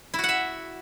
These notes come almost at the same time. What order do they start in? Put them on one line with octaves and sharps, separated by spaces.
E4 F#4 F#5 E5